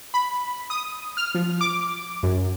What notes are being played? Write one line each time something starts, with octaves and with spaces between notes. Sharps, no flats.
B5
D#6
F6
F3
D6
F#2